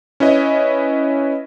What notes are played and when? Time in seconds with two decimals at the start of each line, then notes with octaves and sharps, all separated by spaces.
0.20 C#4 E4 B4 D#5